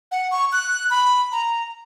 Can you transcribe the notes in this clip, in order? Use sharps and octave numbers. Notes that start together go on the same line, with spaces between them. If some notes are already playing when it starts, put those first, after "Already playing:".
F#5
C#6
F#6
B5
A#5